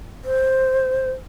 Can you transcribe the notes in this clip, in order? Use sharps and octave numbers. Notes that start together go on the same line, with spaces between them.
C5